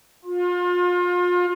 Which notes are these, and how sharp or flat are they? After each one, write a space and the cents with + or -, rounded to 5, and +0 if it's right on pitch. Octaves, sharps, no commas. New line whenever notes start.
F4 +30